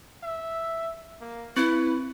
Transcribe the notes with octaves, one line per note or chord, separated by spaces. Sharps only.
E5
A#3
C4 E4 B4